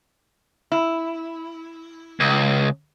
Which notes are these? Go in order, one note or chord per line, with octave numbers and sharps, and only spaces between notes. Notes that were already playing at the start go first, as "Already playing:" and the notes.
E4
C#2